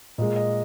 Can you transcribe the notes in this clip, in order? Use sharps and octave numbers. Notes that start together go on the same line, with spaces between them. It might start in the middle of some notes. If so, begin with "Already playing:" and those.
A#2 G#3 D#5
D#5